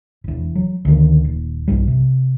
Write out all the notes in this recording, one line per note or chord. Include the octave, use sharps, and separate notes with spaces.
F1 E2
F#3
D2 D#3
D#1
B1 G2 G3
C3